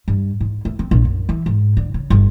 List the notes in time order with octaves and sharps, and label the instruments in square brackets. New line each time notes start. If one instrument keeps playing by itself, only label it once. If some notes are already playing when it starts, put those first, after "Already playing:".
[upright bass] G2
G#2
A3
C4
A#1
F#2
E3
G#2
D3
C#3
G1